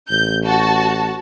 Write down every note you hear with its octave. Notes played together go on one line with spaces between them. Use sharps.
A1 G6
F#4 A5